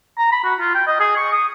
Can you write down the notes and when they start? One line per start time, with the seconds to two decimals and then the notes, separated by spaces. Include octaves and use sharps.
0.18 A#5
0.32 B5
0.44 F#4
0.60 F4
0.75 G5
0.87 D#5
1.00 G#4
1.17 C#6
1.32 D#6